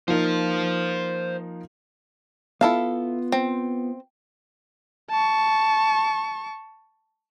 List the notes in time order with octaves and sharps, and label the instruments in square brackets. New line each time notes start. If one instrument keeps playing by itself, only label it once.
[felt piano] F3 A#3 D#4 [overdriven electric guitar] C5 F5
[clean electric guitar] B3 F4 [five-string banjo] E4 A4 F5
[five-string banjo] C4
[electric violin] A5 C#6